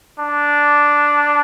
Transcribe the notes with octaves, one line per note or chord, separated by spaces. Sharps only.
D4